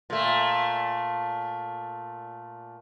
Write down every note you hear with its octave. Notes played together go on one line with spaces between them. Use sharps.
A#2 A3